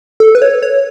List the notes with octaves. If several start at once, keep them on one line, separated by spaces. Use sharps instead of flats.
A4
B4
C#5
C#5